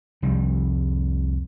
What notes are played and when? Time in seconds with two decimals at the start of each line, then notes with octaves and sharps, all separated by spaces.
0.22 C2 F2 G3